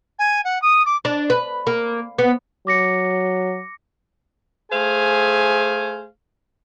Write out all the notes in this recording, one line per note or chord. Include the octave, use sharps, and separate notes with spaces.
G#5
F#5
D#6
D6
D4
B4
A#3
B3
F#3 D6 A#6 C#7
A3 G#4 C5 F5 G#5